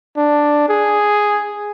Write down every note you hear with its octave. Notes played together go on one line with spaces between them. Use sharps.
D4
G#4